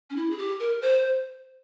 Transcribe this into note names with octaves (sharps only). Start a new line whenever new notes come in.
C#4
E4
G#4
G4
A#4
C5